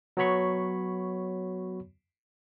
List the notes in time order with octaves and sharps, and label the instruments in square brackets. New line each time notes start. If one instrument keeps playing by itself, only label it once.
[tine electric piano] F#3 B3 F#4 C#5 B5 C#6